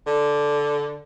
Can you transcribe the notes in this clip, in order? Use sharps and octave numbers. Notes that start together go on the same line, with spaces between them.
D3